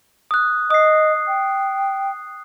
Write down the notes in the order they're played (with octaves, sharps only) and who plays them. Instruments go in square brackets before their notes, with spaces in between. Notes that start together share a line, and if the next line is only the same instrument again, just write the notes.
[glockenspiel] D#6 F#6
[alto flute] D#5 [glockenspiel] D#6 C7
[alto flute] G5